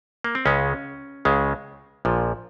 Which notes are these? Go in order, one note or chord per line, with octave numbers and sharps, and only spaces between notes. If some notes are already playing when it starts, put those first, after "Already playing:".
A#3
C4
C#2 C#3 G#3 C#4
C#2 C#3 G#3
A#1 A#2 F3